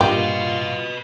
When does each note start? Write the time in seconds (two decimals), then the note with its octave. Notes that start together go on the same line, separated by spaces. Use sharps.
0.01 G2 A#2 F4 G4 B4 D#5